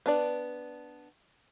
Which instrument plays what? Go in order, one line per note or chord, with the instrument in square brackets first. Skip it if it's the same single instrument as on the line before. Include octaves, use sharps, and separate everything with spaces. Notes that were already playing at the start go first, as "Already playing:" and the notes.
[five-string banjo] B3 D4 D5